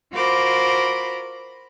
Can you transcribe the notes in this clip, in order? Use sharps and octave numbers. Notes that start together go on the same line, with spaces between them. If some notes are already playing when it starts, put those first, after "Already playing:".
F4 F#4 A#4 C5 B5 D6